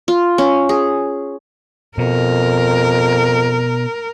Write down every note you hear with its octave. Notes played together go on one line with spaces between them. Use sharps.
F4
C#4
G#4
F2 B2 A#4